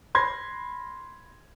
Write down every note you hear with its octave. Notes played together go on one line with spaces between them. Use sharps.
B5 C6 G#6 A#6